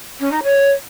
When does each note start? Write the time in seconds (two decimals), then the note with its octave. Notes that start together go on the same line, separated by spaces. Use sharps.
0.19 C#4
0.31 D#4
0.43 C#5